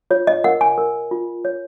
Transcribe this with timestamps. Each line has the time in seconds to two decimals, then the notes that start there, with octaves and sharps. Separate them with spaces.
0.10 F4 C#5
0.27 D#5
0.44 A#4 F#5
0.61 G#5
0.78 A#4
1.11 F4
1.45 C#5